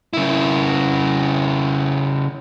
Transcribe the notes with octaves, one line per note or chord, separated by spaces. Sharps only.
C#3 E4